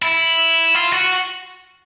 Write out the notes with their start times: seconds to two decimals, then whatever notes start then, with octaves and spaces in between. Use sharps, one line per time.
0.02 E4
0.74 F4
0.92 F#4